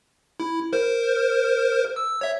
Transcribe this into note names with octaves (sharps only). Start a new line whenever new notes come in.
E4
A#4 C5
E6
C#5 E5